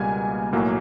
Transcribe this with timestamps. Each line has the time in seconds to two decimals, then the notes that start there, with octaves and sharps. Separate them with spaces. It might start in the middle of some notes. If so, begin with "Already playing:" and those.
Already playing: C#2 B2 G3 A#3 G#5
0.53 B1 A2 F#3 A#3